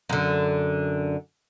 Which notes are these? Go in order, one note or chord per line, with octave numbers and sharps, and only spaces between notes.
F#2 D3